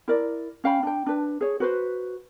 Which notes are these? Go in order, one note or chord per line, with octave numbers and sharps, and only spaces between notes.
E4 A#4 D5
C#4 F5 G5 B5
D4 G5
D4 B4
G#4 C#5
F#4 B4 C5